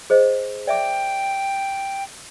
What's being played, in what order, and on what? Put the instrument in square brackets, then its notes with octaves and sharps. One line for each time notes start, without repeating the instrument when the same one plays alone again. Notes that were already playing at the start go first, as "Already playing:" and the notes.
[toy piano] G#4 C5 D#5
[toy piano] D5 E5 D6 [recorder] G5